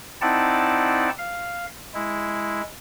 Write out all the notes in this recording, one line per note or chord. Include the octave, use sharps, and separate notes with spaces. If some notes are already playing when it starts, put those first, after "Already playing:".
C4 D#4 E4 D5 F#5 A5
F5
G#3 E4